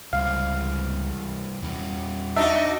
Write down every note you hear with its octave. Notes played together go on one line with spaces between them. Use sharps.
C#2 C3 E3 G3 F5
E2 G3 C#4
D4 D#4 F#4 E5